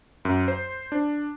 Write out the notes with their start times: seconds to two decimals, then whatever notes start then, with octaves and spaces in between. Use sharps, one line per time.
0.25 F#2
0.48 C5
0.92 D4